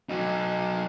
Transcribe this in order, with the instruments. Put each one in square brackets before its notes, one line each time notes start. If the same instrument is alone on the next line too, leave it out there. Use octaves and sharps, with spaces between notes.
[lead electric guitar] F#3 D#4